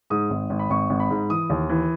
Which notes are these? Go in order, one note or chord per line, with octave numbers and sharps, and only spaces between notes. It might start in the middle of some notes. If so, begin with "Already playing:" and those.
G#2 D#6
G#1
G#1
B5
G#1 C#6
G#1
B5
G#2
E3 D#6
D#2
E3